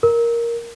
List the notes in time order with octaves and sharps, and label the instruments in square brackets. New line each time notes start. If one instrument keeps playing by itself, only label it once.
[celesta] A#4